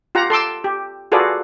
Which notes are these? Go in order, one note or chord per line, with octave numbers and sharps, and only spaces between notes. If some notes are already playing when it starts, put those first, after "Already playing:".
F4 G4 F#5 A#5
A4 C6 D6 E6
G4
F4 F#4 G#4 A4 B4 D5